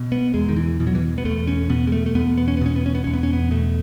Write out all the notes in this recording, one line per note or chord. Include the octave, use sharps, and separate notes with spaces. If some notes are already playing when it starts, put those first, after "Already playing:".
Already playing: B2
B3
E2 G#3
D#3
E3
B2 E3
F#3
E3
B3
E2 A3
C#4
B2 B3
G#3
A3
A3
E2 B3
B3
C#4
B3
B2 C#4
B3
C#4
B3
E2 C#4
B3
C#4
B3
B2 A3